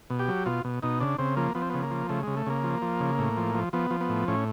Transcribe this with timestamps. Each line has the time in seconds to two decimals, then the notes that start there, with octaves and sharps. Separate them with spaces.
0.10 B2
0.19 G4
0.28 F#3
0.46 B2 F4
0.65 B2
0.83 B2 D#4
1.00 C#3 D4
1.18 C#3 C4
1.37 F3 A#3
1.55 F3 B3
1.62 C4
1.70 C#3 B3
1.82 A#3
1.91 F3
2.09 C#3 A3
2.23 C#3 G#3
2.37 A3
2.46 C#3 A#3
2.64 F3
2.82 F3
3.00 C#3
3.19 A2
3.37 F3
3.55 F3
3.73 F3 B3
3.91 F3
4.01 B3
4.09 A2
4.28 A2 C#4